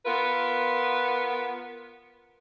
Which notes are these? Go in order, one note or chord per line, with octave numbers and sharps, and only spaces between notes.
B3 F4 A#4 B4